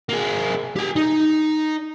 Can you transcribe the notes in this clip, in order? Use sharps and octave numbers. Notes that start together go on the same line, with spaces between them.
A#3 G#4
G4 G#5
D#4